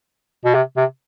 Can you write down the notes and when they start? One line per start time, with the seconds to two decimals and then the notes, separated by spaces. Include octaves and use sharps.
0.45 B2
0.55 C3
0.77 C3